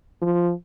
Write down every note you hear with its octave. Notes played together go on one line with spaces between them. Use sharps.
F3